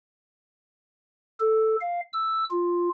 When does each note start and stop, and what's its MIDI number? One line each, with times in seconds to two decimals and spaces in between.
1.40 1.76 69
1.80 2.00 77
2.13 2.44 88
2.50 2.89 65